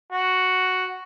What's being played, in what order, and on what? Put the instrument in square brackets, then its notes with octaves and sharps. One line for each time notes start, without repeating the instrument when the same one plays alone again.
[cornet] F#4